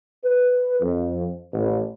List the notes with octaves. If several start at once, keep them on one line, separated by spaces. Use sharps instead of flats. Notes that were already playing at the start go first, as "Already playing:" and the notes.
B4
F2
A1